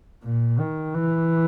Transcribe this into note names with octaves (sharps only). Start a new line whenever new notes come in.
A#2
D#3
E3